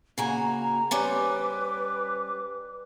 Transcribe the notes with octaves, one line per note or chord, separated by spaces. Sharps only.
C#3 A#3 F#4 G#5 A#5
G3 C#4 B4 C5 D6